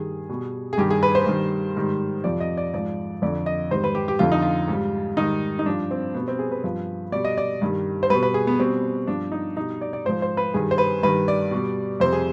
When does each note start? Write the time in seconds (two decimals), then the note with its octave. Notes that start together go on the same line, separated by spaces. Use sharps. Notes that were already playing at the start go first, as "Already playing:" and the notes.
Already playing: G2 D#3 G3 G#4
0.30 B2 G3
0.73 G#4
0.78 G2 D#3 G3 G4
0.90 G#4
1.03 B4
1.15 C5
1.26 G2 D#3 G3
1.76 G#2 D#3 G3
2.24 F2 C3 F3 D5
2.40 D#5
2.57 D5
2.74 G#2 F3 D5
3.22 F2 D3 F3 D5
3.46 D#5
3.71 G#2 D#3 G3 C5
3.84 B4
3.95 G4
4.08 G4
4.19 F2 D3 F3 F4
4.32 D#4
4.42 F4
4.68 G#2 G3
5.17 G#2 D#3 G3 D#4
5.59 D#4
5.66 G2 F3 D4
5.91 C4
6.14 B2 G3 B3
6.28 C4
6.39 G#4
6.52 B4
6.64 G2 F3
7.12 B2 G3 D5
7.25 D#5
7.38 D5
7.62 G2 D#3 G3
8.03 C5
8.10 G3 B4
8.14 B2
8.23 B4
8.34 G#4
8.47 B3
8.59 B2 G3 C4
9.07 G2 F3 D4
9.32 D#4
9.56 B2 G3 D#4
9.81 D5
9.93 D5
10.05 G#2 F3 C5
10.22 C5
10.37 B4
10.54 G2 D#3 G3 G#4
10.71 C5
10.78 B4
11.03 G2 D#3 G3 B4
11.28 D5
11.51 B2 G3
12.00 F2 C3 G3 C5
12.13 G#4